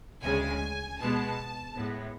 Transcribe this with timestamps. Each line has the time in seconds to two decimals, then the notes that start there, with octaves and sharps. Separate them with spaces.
0.22 D2 C#3 G#3 G#5
0.99 B2 G#3 B3 A5
1.76 A2 G#3 B3